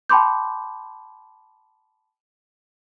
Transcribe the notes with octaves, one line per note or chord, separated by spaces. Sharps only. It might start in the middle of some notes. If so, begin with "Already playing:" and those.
G5 A5 B5 C6 D6 G6